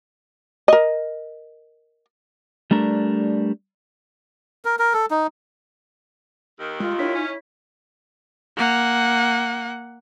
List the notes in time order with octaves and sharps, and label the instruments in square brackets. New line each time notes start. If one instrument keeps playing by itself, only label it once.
[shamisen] A#4 D#5
[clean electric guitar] G3 A3 D4 A#4
[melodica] A#4
A#4
A4
D#4
[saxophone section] D#2 D#3
[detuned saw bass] G#3 [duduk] F4
[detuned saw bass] D4 [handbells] E4 C#5 B6
[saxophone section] C#4 [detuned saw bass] D#4
[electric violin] A#3 F#5